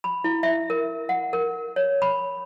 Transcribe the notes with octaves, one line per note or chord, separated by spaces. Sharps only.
B5
E4
E5
A#4
F#5
A#4
C#5
B5